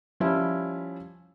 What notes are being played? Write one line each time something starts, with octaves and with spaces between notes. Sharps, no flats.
F3 G3 C#4 E4